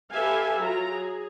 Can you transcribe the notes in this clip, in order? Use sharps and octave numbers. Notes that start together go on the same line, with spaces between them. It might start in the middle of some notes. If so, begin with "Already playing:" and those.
G4 A4 B4 E5 F5 G#5
F#3 F4 A#5
G#4